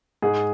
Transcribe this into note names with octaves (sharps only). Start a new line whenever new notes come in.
G#2 G#4